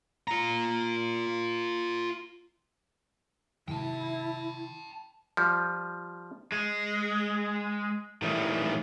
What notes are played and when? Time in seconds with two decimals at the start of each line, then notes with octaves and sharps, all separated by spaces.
0.28 F4 A#5
3.68 C3 D#3 F#3 E4 G5 A5
5.37 F3 G3
6.52 G#3
8.22 A2 D#3 E3 G3